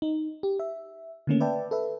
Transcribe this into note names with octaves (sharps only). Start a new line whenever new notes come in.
D#4
G4
E5
D3 D#3 A3 A#3 C#4
B4 D5 E5 G5 A5
A4 B4 E5